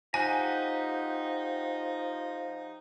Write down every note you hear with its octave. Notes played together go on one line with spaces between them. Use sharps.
F3 D#4 G4 F#5 G#5 A#5